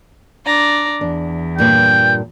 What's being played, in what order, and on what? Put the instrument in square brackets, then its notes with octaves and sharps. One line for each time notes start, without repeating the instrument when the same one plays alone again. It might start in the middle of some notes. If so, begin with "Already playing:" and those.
[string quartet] D4 D5 A#5
[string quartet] E2 [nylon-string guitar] D4
[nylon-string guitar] G2 A#2 B4 [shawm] G5